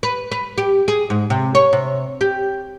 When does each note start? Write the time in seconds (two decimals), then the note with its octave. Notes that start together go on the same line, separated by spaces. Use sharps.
0.03 B4
0.32 B4
0.58 G4
0.88 G#4
1.10 G#2
1.30 C3
1.55 C#5
1.73 C3
2.21 G4